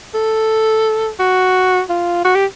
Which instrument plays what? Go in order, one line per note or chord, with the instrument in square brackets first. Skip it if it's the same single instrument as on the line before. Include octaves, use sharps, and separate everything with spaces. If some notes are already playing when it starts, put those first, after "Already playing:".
[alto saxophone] A4
F#4
F4
F#4
G4